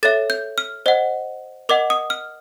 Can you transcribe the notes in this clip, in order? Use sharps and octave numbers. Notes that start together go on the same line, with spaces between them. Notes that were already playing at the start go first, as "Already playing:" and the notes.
A4 C#5 E5 A6
G6
F6
C5 D#5 F#5
A#4 D#5 F#5 D6
D#6
F6